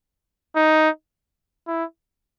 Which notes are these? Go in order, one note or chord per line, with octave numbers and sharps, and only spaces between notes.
D#4
E4